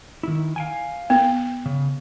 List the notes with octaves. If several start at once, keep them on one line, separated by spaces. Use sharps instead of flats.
D#3 E4
F5 G5 G#5
B3
C#3